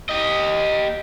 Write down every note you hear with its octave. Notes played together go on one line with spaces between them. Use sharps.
G4 D#5